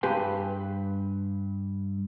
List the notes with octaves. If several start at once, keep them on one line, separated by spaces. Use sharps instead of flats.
G2 G4 B4 G#5 C6